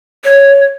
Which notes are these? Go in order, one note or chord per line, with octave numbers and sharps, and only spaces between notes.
C#5